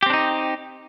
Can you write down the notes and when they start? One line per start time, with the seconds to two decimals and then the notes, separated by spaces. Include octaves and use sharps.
0.03 G4
0.06 C4
0.10 D4
0.13 D#4